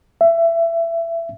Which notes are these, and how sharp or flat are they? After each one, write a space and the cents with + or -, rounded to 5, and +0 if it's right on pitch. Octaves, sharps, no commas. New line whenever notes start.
E5 +20